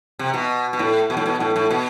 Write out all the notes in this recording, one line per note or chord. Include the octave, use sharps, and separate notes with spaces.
C3
B2
B2
A2
B2
A2
B2
A2
A2
B2